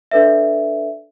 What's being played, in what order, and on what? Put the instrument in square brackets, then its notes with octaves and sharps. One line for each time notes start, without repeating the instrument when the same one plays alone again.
[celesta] D4 A4 B4 D5 E5